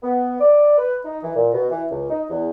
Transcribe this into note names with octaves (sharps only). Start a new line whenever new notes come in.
B3
D5
B4
D#4
E3
A#2
B2
E3
C#2
D#4
E2